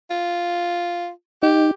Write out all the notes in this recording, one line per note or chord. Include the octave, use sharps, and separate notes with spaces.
F4
D#4 G4